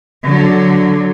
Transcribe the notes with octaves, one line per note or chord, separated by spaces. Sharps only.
D3 F#3